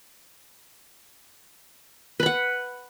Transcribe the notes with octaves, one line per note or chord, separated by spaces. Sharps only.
B4 F#5 B5